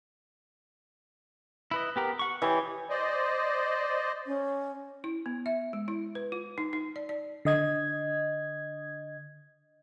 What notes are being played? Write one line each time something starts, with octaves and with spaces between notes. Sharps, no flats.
E4 B4 D#5
B3 G4 A#4
F#5 C#6
E3 G4 C#5 D#5
C5 D5 D#5
C#4
E4
B3
E5
G#3
E4
B4
F4
D#4
D#4
D5
D5
D3 D#5 G#6